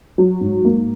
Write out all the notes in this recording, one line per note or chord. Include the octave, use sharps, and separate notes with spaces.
F#3
G#2
A#3